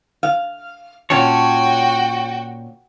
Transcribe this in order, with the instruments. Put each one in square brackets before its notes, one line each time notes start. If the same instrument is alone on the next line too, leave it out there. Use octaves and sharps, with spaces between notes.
[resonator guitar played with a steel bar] F5
[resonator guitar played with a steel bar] A#2 C#4 A5 [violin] F#4 G5 [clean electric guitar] C#5